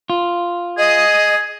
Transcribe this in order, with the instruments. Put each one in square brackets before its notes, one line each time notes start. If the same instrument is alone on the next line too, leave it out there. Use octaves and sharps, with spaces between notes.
[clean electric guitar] F4
[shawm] G#4 [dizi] D#5